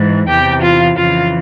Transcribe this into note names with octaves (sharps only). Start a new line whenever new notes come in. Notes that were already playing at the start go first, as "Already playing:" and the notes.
Already playing: G#2 E3
E2 C3 E3 G4 G5
F4 F5
F2 C#3 E3 F4 F5